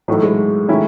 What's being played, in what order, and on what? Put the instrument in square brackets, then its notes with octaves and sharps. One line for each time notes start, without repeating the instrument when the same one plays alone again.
[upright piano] A2 E3 A3 D#4 [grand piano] F#3
[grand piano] G#3
[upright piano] D#3 A3 C#4 E4